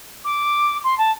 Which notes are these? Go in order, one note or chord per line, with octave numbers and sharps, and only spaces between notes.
D6
C6
A5